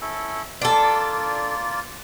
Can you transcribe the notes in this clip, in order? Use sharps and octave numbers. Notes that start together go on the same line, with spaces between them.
C#4 E4 A4
A#3 D4 F4 A4 D5